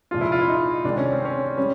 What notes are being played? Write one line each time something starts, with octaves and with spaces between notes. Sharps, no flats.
C2 A#2 F3 G#3 F4
E4
F4
E4
D#4
C2 C3 D#3 G#3 D4
C#4
C4
C#4
G3 C#4